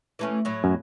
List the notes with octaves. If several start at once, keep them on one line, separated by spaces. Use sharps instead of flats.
E3 A3 C#4
A2 F#3
F#2